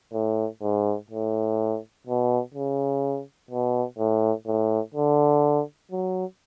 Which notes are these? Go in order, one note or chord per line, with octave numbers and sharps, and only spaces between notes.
A2
G#2
A2
B2
C#3
B2
A2
A2
D3
F#3